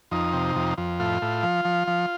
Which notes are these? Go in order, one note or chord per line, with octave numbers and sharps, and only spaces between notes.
F2 D#4
C3
F2
F2
A2 F4
A2
F3
F3
F3